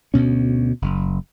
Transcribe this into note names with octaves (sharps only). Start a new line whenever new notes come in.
D2 B2 C#4
F#1